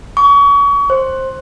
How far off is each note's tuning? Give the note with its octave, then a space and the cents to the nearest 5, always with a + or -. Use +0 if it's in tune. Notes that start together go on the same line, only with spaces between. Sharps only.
C#6 +35
C5 +15